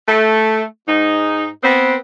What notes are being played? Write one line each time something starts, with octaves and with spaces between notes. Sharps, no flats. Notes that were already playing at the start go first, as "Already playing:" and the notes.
A3
G#2 D#4
B3 C4